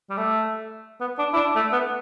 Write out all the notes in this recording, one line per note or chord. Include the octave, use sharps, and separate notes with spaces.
G3
A3
B3
D4
E4
D4
A3
B3